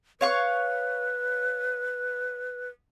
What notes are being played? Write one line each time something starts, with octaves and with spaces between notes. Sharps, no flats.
B4 C#5 F5 C#6